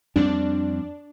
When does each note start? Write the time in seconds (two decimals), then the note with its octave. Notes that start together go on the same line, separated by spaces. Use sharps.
0.16 F2 G3 C4 D4